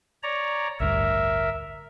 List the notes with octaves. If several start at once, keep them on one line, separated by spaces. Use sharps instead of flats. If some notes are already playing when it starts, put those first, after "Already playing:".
C#5 D5 A#5
A1 D2 G2 A#4 E5